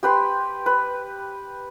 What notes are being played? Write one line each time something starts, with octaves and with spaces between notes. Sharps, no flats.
G4 B4 C6
B4